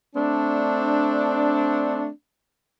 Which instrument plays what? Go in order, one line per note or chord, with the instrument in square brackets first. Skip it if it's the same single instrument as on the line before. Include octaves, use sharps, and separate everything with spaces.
[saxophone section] A3 C4 D4